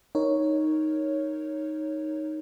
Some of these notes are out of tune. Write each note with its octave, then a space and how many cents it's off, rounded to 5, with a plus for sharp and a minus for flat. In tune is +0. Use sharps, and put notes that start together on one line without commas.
D#4 +0 A#4 +0 C#5 +0